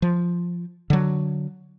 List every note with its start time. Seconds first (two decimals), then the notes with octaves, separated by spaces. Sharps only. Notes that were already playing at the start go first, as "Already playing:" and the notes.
0.02 F3
0.90 D3 F#3